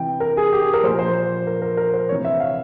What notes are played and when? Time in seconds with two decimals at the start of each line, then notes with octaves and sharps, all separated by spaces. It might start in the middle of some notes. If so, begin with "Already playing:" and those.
Already playing: C3 E3 G5
0.20 A#4
0.37 G#4
0.53 G4
0.62 G#4
0.74 A#4
0.83 A#2 F3 C5
0.99 C5
1.47 A#4
1.62 A#4
1.77 A#4
1.94 C5
2.08 C3 C#5
2.12 E3
2.25 E5
2.40 F5